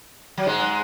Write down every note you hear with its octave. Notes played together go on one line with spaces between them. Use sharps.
F#3
G#2 G#3